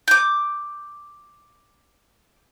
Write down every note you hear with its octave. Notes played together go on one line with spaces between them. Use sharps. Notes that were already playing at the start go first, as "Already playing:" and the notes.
D6 G6